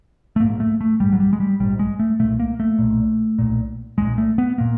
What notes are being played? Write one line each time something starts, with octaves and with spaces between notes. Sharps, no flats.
A3
A#1 G#2 A#3
A3
A3
A#1 G#2 G3
F#3
G3
G#3
G3
A#1 G#2 G3
G#3
A3
B1 A#2 A3
A#3
A3
B1 A#2
B1 A#2
B1 A#2 G#3
A3
B3
A#2 A#3